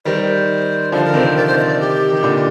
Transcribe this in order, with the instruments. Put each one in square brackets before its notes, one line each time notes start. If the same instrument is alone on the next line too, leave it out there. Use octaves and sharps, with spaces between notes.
[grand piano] D#3 G3 [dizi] C5
[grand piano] D3 F3 [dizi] C5
[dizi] A#4
[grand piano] C3 D#3 [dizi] C5
[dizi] D5
C5
D#5
D5
G4
[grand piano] D#3
A#2 D3